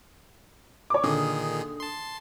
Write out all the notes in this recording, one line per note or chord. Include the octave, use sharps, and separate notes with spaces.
C#5 D6
A#2 D3 D#3 G#4 D#6
A5 C6